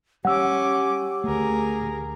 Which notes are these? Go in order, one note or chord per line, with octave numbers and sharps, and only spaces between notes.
G3 C#4 G4 F#5 D6 E6
D2 A3 G#4 A#4